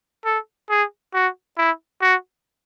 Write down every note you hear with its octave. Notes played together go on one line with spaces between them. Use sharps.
A4
G#4
F#4
E4
F#4